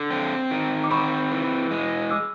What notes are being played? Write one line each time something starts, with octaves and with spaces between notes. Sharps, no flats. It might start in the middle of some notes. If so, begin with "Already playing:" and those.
Already playing: D3
C4
D#3
D6
C4 B5 C#6
E3
G#3
D6 E6